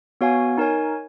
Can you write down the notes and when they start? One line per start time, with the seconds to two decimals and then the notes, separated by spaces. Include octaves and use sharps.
0.21 B3 F#4 C#5 F5 G#5
0.58 D#4 A#4 C#5 G#5